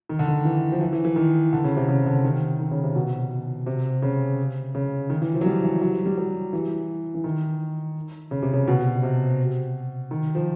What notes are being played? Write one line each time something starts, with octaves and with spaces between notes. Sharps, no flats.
D#3
D3
D#3
E3
F3
E3
E3
E3
D#3
D3
C#3
C3
C#3
D3
D#3
D#3
C#3
C3
B2
C3
C#3
C#3
D#3
E3
F3
F#3
G3
E3
F#3
G3
F#3
E3
E3
D#3
C#3
C3
C#3
B2
C3
D#3
F3